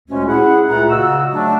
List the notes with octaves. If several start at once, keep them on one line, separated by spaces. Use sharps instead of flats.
D2 A#2 G#3 A3 C#4
E4 G#4 F#5
C#2 A#2 A3 G#4 F#5 A#5
C#3 F#4 D#5 E6
F#3 A3 D4